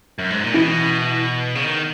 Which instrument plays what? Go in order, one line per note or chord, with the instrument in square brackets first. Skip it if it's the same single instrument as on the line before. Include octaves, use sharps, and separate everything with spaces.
[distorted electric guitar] F#2
G#2
A#2
[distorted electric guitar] B2 [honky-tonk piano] E3
[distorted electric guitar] C#3
D#3